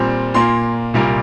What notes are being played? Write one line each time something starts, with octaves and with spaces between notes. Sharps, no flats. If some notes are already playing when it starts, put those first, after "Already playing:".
Already playing: A#2 G3 C4
A#2 A#3 C6
C2 A#2 G3 A#3